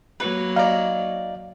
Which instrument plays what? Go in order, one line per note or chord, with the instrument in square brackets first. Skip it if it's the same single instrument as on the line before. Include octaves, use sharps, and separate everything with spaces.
[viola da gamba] F#3 A#3 [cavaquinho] B4
[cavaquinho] D#4 D5 [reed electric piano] F5